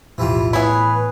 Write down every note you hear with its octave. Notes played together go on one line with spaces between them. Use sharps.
B1 E2 A2 E3 G3 F4
A2 E3 B3 E4 G#4 B4 C#5